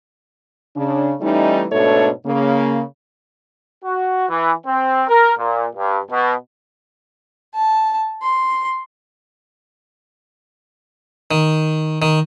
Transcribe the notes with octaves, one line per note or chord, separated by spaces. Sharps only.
C#3 D4
E3 G3 A3 C#4 D#4
G#2 B2 A3 D4 A4 C#5
C#3 A#3
F#4
E3
C4
A#4
A#2
G2
B2
A5
C6
D#3
D#3